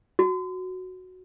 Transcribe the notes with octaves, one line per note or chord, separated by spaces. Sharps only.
F#4